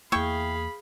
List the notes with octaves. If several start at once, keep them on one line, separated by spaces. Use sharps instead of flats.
E2 A#3 E4 G#4 F5 G5 B5 C#6